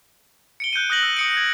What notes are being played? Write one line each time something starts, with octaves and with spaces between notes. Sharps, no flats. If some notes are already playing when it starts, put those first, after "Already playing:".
C#7 D7 G7
F#6 G6 C#7 D#7
D#6 F#6 A#6 F#7
E6
D#6 C#7 D7
G#6